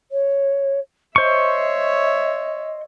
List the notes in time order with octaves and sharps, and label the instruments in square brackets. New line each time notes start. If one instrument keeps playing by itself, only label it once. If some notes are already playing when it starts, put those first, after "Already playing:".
[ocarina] C#5
[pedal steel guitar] C5 C#6 [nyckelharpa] C#5 E5 [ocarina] D#5